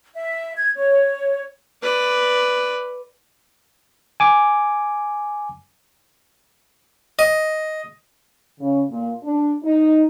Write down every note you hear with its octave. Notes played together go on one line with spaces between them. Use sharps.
E5
G#6
C#5
B4 D5
G#5 D6
D#5
C#3
A#2
D4
D#4